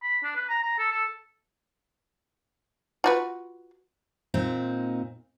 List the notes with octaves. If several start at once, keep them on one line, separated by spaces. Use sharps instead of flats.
B5
D4
B4
A#5
A#5
A4
A4
F4 F#4 B4
A#2 C4 D#4